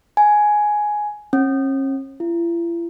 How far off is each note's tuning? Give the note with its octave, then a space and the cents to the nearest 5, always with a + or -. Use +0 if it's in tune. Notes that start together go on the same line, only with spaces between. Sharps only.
G#5 +10
C#4 -40
E4 +45